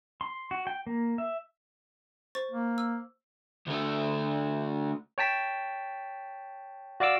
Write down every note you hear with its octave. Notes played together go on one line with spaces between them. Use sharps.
C6
F#4
G5
A#3
E5
C5 C#6 A6
A#3
E6
D2 A3
C#5 G5 A5 B6
F#4 D5 F5 D6 E6